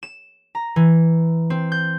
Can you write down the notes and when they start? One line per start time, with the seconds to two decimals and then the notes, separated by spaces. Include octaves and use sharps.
0.03 E7
0.55 A#5
0.76 E3
1.50 C4
1.72 G6